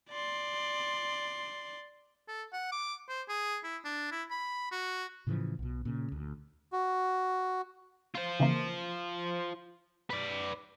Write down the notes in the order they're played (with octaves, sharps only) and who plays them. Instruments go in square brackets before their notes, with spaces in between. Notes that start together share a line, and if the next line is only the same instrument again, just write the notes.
[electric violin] D5 C6
[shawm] A4
F#5
D6
C5
G#4
E4
D4
E4
B5
F#4
[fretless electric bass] A2 C#3 E3 F3
B1 B2
A#2 C#3
D2
[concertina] F#4
[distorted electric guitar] F4 C5
[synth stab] C#3 E3 A#3
[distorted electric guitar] B4 D5